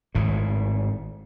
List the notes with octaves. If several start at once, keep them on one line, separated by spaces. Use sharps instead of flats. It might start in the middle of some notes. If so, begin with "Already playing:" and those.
G#1 A2